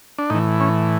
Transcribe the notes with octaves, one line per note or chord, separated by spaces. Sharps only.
D4
A2 E3 D#4
C#4